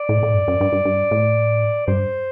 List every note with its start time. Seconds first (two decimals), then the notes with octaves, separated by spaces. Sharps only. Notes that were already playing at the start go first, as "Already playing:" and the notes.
Already playing: D5
0.09 A2
0.23 A2
0.34 G2
0.48 F#2
0.61 G2
0.73 G2
0.85 G2
1.11 A2
1.87 G2 C5